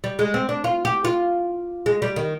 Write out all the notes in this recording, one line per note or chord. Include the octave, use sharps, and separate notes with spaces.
G3
G#3
C4
D4
F4
G4
F4
G#3
G3
D#3